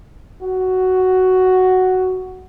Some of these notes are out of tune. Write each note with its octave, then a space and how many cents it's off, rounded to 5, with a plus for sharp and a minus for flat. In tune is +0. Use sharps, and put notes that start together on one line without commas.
F#4 +5